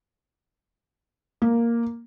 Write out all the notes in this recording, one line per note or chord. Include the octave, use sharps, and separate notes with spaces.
A#3